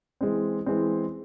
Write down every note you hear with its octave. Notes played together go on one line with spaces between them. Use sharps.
E3 G#3 C4
E3 G#3 C4